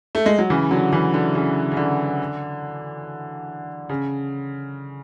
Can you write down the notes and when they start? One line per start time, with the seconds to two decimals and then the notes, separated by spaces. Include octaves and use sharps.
0.15 A3
0.26 G#3
0.38 F#3
0.50 C#3 E3
0.71 D3 F#3
0.92 C#3 E3
1.14 D3
1.35 C#3
1.72 C#3
1.77 D3
3.89 C#3